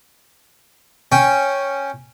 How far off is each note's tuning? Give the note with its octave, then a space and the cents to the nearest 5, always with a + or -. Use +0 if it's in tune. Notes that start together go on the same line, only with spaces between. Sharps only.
C#4 +0 G5 +0